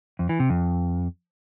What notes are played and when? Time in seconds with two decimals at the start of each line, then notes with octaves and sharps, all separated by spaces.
0.19 F2
0.29 E3
0.40 C3
0.50 F2